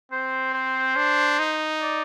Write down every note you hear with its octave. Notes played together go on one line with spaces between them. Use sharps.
C4 C5
C5
D4
D#4
D5